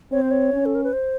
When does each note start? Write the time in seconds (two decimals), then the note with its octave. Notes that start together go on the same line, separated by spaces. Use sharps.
0.12 C4 C#5
0.21 C5
0.31 C#5
0.53 C#4
0.66 A4
0.75 A#4
0.84 B4
0.93 C5